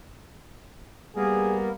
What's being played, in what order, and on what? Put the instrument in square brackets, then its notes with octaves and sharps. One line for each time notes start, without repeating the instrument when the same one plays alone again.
[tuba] G3 [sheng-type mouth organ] A#3 B3 A#4 [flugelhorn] G#4